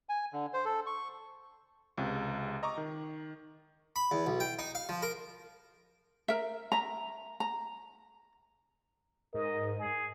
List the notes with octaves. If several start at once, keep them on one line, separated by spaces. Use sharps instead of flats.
G#5
D3
C5
A4
C#6
C#2 C3
D#5 A#5 C#6 D6
D#3
B5
E2
B1
G5
D#4
F5
F3
A#4
A#4 E5
E5 A#5
A#5
G#2 A#4 D#5
G#4